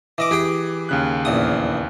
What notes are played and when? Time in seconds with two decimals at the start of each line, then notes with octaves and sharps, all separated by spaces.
0.18 E3 D#5 D6
0.31 E3 G4 G#4 G5
0.89 D#2 C#3 F#6
1.25 A#1 E2 D#6